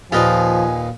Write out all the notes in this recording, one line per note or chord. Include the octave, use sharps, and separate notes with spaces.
D#2 A#2 F3 F4 B4 D#5 G#5